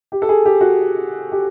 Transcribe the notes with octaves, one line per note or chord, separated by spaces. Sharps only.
G4
A4
G#4
G4
F#4
G4